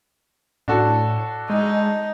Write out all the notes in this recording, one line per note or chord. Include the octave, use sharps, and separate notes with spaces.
A2 D4 F#4 A4
G#3 D#4